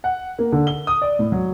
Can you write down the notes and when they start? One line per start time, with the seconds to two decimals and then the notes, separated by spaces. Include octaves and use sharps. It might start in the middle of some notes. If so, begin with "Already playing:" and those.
0.04 F#5
0.39 A#3
0.52 D3
0.67 G7
0.87 D#6
1.02 D5
1.19 A2
1.32 F#3